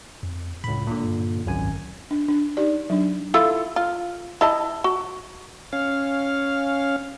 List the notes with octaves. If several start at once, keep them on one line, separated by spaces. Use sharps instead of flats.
F2
C#2 A2 B5
A#2 D3
G2
G#1 C#2 F#2 G#5
D4
D4
D#4 G4 D5
F#3 D4
E4 F4 A4
F4
E4 D#5 A5
F#4
C#4 F5